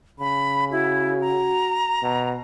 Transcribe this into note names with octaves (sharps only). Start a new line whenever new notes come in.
C#3 B5
E4 F#4
A#5
B2